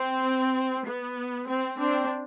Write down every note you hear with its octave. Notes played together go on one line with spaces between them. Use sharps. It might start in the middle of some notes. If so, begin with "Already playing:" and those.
Already playing: C4
B3
C4
C4 D4